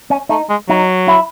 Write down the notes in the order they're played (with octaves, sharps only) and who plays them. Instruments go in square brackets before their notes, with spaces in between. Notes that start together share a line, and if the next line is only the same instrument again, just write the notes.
[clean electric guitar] C#4
[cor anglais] A3 [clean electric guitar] D#4
[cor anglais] G#3
[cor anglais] F#3 [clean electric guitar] D#4
[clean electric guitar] E4